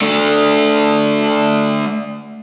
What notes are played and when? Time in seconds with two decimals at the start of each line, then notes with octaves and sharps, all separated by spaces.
0.02 A3 D4